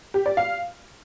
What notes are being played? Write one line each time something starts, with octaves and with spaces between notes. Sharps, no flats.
G4
D5
F5